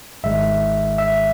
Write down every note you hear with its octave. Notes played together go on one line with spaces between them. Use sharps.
G#1 G#2 D#3 G#3 E5
E5